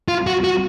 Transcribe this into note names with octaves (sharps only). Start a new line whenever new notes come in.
F4
F#4
F#4